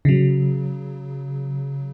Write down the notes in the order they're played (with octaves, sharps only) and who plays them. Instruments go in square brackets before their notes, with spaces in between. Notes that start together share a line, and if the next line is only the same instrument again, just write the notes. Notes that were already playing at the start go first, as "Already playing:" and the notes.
[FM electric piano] C#3 F#3